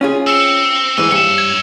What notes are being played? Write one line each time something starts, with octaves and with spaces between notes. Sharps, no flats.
C#4 F4 G#4
C4 E6 C#7
C#2 G#2 E3 G#5 E6
G2 C#5 E5
G#6 E7